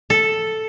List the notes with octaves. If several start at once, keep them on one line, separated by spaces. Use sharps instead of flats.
A4